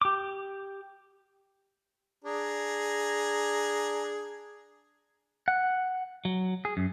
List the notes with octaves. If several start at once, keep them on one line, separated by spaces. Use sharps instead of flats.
G4 D6
D4 G#4 A#5
F#5
F#3
G#4
F#2